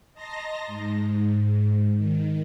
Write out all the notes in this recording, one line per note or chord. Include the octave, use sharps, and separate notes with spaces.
D#5 A5 A#5 C6 A#6
G#2
D#3